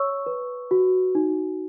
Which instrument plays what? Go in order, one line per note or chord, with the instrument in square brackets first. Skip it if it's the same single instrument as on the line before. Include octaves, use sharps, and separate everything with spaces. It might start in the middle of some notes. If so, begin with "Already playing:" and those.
Already playing: [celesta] C#5 C#6 E6
B4
F#4
D#4